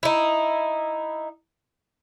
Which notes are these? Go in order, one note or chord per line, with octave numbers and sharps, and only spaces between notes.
D#4 E4